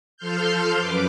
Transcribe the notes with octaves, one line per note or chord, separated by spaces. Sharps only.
F3 A4 C6 F6 G6
F#2 B4 D6